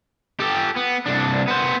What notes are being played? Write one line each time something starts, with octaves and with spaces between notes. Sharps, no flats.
G4 A4
B3
C2 D4
B3 C5